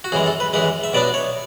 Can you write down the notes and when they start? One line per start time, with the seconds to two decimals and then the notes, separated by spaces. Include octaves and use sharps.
0.04 F#4
0.12 F#2 E3 G#3 G#4
0.26 A4
0.40 B4
0.53 F#2 E3 G#3 B4
0.84 E5
0.93 B2 F#3 B3 D4 D5
1.14 C#5